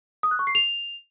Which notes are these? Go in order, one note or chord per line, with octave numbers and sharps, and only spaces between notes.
D#6
F#6
C#6
C7
F7